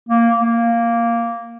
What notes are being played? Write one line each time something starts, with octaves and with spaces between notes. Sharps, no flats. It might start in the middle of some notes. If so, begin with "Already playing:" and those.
A#3
A#3